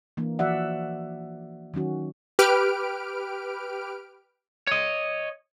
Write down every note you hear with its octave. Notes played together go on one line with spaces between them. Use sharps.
E3 A#3 D4
E3 F3 F#4 D5 E5 F#5
D#3 F#3 C#4 F#4
G4 B4 F6 D7
C#5 D#5